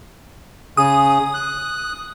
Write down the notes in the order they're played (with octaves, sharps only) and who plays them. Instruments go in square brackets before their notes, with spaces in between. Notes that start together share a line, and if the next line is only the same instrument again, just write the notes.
[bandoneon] C#3 G#4 [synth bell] D#6
[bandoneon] F#6